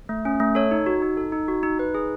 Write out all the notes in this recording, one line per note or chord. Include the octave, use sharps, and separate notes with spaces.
A3
C#4
A3
A4 C#5
D#4
F#4
D#4
A4
D#4
F#4
D#4
D#4 B4
G#4